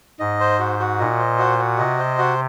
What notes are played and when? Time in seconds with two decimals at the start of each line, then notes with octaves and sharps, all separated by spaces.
0.20 G#2 D#5
0.40 C5
0.59 F#4
0.80 F#4
0.99 A#2 D#5
1.19 C5
1.38 F#4
1.58 F#4
1.78 C3 D#5
1.98 C5
2.18 F#4